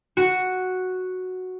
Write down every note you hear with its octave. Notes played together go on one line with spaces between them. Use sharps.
F#4